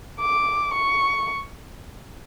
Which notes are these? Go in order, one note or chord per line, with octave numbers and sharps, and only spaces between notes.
D6
C#6